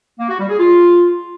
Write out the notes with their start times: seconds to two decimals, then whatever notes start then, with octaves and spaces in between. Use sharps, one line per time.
0.19 A#3
0.29 F#4
0.39 G3
0.49 G#4
0.59 F4